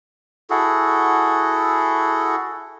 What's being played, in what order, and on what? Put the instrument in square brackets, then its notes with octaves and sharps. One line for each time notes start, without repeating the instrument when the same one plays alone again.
[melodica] E4 F#4 G#4 A4